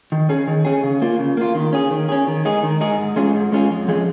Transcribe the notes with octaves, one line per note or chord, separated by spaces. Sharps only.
D#3
C#4 G#4
D#3
C#4 G#4
C#3
A#3 F4
C#3
A#3 F4
D#3
C#4 G#4
D#3
C#4 G#4
D#3
G#3 D#4 G#4
D#3
G#3 D#4 G#4
G#2
G#3 C#4 F4 G#4
G#2
G#3 C#4 F4 G#4
F2
F3 G#3 C#4 G#4